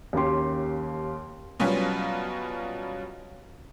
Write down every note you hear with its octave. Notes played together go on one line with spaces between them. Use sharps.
D#2 A#3 C#4 G4 C6
B2 F#3 G3 C#4 F4 B4